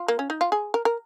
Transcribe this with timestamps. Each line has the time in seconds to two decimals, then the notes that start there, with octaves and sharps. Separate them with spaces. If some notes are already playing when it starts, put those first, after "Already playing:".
Already playing: F4
0.08 A#3
0.19 C#4
0.30 D#4
0.41 F4
0.52 G#4
0.74 A#4
0.85 A#4